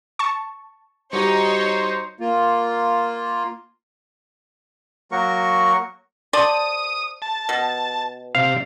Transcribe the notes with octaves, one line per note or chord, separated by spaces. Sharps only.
A5 C#6
G3 D#4 F#4 G4 C5 C#5
A#3 F4
F#3 A#3 F#4 A#4 C#6
C5 D5 A5 D#6
A5
B2
C3 F5